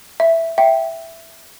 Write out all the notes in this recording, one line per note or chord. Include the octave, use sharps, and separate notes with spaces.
E5
E5 G5